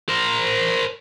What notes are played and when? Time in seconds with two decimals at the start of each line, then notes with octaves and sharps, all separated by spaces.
0.09 A#4 C5